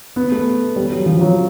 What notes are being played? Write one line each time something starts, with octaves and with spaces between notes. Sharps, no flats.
B3
A3
G3
F#3
F3
F3
F#3